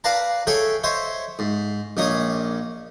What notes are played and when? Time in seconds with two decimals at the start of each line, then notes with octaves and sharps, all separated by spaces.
0.04 B4 D5 F5 A5 A#5
0.47 G#4 A4 C#5 E5 G5
0.84 C5 C#5 D#5 E5
1.39 G#2
1.97 A#1 A#2 D#4 C#5 D#6